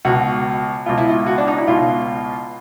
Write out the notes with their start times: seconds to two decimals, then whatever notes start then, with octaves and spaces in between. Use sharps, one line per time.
0.05 C#2 B2 F#4
0.86 C#2 B2 F4
0.98 E4
1.09 F4
1.27 F#4
1.38 D4
1.48 D#4
1.58 E4
1.67 C#2 B2 F4